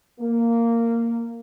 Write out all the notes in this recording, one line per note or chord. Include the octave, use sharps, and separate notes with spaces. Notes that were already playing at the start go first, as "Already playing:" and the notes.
A#3